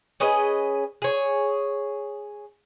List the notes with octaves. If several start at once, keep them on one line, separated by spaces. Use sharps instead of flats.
C#4 G#4 B4 D#5
G#4 C#5